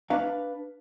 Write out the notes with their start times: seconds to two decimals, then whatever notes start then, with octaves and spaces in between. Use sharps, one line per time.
0.10 D4 B4 F5